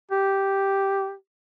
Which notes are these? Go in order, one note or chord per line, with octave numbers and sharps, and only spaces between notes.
G4